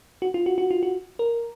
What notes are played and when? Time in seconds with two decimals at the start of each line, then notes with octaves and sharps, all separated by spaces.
0.22 F#4
0.34 F4
0.46 F#4
0.58 F#4
0.71 F4
0.83 F#4
1.19 A#4